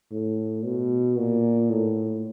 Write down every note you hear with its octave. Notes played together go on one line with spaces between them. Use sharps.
A2
B2
A#2
A2